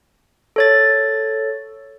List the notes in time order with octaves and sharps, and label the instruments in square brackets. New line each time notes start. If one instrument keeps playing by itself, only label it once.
[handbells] A4 C#5 A6